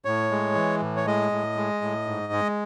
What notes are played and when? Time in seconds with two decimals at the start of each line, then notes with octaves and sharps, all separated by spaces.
0.05 A2 C#5
0.31 G#3
0.55 E3
0.82 A2
0.97 C#5
1.06 G#3 D#5
1.32 A2
1.57 G#3
1.81 A2
2.06 G#2
2.33 G#3